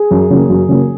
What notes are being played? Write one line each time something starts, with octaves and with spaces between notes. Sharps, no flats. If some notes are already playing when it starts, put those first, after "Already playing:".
Already playing: G#4
F#2
C#3 F#3 A#3
F#2
C#3 F#3 A#3